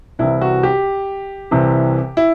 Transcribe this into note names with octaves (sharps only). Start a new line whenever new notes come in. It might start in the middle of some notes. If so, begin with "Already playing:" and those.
C2 C3 E3 E4
F#4
G4
C2 C3 E3
E4